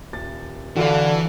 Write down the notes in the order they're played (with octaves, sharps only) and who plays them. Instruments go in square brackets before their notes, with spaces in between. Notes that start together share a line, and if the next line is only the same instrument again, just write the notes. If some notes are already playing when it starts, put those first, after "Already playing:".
[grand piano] D#1 A6
[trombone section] D3 [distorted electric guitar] E3 [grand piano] F#4 A4 F5